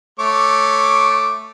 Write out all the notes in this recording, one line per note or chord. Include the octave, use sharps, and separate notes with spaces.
A3 C#5 D6